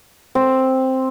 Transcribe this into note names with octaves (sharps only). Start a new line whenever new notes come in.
C4